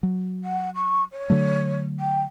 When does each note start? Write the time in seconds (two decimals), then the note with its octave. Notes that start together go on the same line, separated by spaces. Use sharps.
0.03 F#3
0.44 F#5
0.75 C#6
1.12 C#5
1.30 D3 F#3 A3
1.99 G5